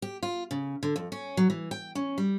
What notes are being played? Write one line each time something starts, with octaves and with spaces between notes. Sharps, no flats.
G4
F4
C#3
D3
F2
C#4
F#3
E3
G5
C#4
G3